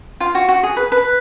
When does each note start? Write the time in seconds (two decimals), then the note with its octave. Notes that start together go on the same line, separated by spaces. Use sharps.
0.20 F4
0.35 F#4
0.49 F#4
0.63 G#4
0.77 B4
0.92 B4